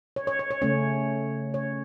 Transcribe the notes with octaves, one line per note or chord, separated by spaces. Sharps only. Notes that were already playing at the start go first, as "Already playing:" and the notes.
C#5
C#5
C#5
C#5
C#3 A3 C#4 C#5
C#5